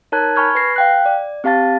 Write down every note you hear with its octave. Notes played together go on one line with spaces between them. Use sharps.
D#4 A#4 C#5 A5 F#6 G#6
G#5 B5 C#6 F6 G#6
B4 A#6 C7
F5 G5 F#6
D5
C4 G4 F5 A5 A6